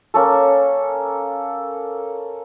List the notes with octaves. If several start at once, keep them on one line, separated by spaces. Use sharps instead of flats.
A#3 C#4 A4